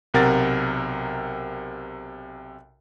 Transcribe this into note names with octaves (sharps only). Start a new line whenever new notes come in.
B1 C3 A#4 F#5 A6